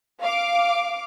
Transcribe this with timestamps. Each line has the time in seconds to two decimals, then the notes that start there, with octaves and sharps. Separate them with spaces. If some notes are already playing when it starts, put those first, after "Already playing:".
0.23 F5 D6